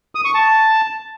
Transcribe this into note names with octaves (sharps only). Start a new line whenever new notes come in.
D#6
C#6
A5